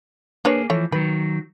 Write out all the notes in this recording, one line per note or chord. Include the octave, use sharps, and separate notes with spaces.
A#3 D4 G#4 B4 C#5
E3 F3 A3 C#5
D#3 F#3 B4